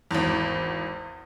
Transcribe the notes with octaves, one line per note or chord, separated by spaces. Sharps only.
G#1 E2